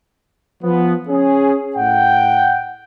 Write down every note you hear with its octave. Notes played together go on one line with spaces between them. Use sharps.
F3 B3
C#4 G#4
A2 F#5 G5